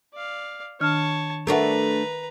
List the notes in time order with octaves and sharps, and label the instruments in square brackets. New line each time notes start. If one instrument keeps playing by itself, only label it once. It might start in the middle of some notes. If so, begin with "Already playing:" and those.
[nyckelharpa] D5 F5
[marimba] D#3 D4 F6 [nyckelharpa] C#5 A5
[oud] A3 D4 F#4 [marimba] A#4 E5 [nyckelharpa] B4 A#5